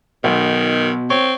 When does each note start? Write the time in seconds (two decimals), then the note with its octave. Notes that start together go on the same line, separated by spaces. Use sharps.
0.24 B1 B2 D#3
1.10 C4 C#5